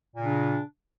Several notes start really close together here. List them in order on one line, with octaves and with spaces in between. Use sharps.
A#2 C#3 D4